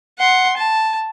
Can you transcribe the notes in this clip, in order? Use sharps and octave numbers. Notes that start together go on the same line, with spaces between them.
F#5 C6
A5